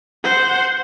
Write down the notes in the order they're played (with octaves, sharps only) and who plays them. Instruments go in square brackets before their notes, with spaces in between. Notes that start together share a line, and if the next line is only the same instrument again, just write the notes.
[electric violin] C5 F#5